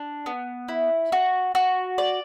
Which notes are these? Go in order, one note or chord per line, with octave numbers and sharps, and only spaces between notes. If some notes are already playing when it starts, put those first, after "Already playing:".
Already playing: D4
B3
E4
F#4
F#4
D5